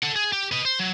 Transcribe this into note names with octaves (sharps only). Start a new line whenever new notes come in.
A4 F#5
G#4
G4
B4 D#5
C5
F#3